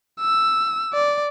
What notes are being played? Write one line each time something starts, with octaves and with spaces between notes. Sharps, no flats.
E6
D5